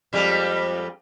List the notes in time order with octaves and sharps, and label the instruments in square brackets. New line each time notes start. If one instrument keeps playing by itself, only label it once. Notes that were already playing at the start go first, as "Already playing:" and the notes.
[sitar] F2 G3 G#3